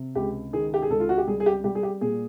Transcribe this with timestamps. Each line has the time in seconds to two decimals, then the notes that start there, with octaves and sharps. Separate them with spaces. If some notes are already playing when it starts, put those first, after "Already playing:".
Already playing: C3
0.15 C#2 G4
0.53 D#3 G#4
0.74 G4
0.82 G#4
0.90 C#2 A4
1.00 F4
1.09 F#4
1.18 G4
1.27 G3 G#4
1.40 G#4
1.46 G4
1.64 G3 G4
1.75 G#4
1.83 G4
2.01 A#2 G#4